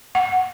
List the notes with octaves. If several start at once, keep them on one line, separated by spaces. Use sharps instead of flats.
F#5